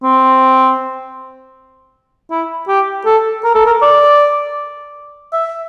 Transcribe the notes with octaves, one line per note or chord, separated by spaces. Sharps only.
C4
E4
G4
A4
A#4
A4
A#4
D5
E5